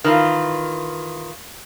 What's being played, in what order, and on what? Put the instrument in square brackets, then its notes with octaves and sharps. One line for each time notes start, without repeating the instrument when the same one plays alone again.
[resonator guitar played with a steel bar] D#3 E3 F4